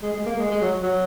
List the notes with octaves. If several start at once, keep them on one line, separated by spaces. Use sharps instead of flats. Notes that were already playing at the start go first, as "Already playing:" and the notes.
G#3
G#3
A#3
G#3
G#3
F#3
F#3